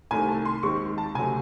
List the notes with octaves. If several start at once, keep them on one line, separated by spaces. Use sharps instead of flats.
C2 C3 D#3 A3 G#5
A5
C6
D#2 D#3 G#3 C4 C#6
A5
C#2 C3 F#3 A3 G#5